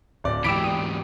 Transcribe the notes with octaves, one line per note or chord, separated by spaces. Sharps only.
D1 D5
G#2 E3 G4 B5 D6 E6 D7
D#6